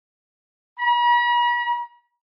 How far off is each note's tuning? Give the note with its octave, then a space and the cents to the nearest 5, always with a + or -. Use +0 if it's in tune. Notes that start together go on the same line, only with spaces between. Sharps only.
B5 -45